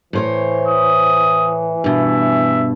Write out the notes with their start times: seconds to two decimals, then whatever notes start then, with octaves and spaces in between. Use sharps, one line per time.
0.13 A2 E3 C5 C#5
0.68 D#6
1.84 G2 B2 E5